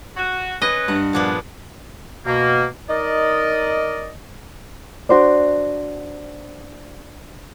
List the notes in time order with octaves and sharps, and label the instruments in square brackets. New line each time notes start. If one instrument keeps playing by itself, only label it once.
[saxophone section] F#4
[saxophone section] C#4 B4 [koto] D#5
[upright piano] G2 [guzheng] F#5
[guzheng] A#2 F3 B3 [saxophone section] G#3 D5 F#5
[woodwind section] B2 A#3
D#4 A#4 D5 D#5
[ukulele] D4 F#4 C5 D5